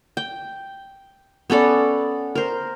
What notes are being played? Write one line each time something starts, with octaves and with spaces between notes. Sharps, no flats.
G5
B3 C#4 A4 D5
A#4 C5